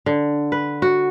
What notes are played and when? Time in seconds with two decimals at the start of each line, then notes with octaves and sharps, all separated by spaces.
0.06 D3
0.52 B4
0.82 F#4